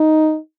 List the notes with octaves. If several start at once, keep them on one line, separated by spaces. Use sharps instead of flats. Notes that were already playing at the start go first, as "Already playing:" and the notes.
Already playing: D#4